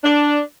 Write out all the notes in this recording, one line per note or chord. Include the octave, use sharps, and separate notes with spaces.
D4